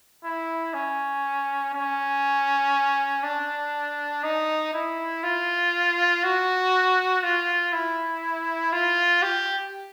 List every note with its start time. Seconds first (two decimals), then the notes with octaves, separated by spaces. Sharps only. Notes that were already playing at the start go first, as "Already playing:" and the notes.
0.24 E4
0.74 C#4
1.74 C#4
3.23 D4
4.23 D#4
4.74 E4
5.23 F4
6.23 F#4
7.23 F4
7.73 E4
8.72 F4
9.22 G4